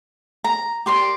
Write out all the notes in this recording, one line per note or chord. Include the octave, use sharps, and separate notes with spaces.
A#5
G4 A#4 D5 C6